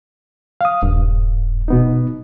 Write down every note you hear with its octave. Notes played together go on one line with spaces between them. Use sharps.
F5 D#6
D#1 G2
B2 B3 D#4